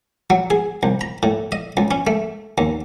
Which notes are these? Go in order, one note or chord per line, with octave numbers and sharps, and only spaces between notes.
F#3
G#4
C2
A#5
A2
D#5
C#2
C#4
A3
D#2